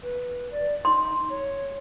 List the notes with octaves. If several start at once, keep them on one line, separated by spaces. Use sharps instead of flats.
B4
D5
D#4 C6
C#5